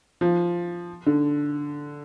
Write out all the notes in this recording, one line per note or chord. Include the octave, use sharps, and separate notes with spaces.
F3
D3